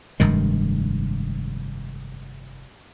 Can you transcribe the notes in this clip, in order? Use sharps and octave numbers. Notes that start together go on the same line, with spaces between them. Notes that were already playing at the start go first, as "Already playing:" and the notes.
F1 G2 D#3 G#3